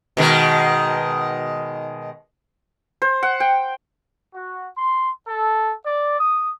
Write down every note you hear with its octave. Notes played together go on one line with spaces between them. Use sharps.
B2 D#3 G#3
C5
F#5
G5
F#4
C6
A4
D5
D#6